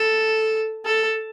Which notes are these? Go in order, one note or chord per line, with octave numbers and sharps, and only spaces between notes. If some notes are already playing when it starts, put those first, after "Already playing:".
Already playing: A4
A4